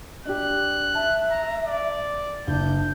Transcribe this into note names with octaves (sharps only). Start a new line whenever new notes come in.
D4 G4 F#6
E5 A5
A#5
D5
F#1 D4 G6